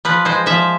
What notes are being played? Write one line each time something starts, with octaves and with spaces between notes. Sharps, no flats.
F3 B4
G#3 C5
F3 E5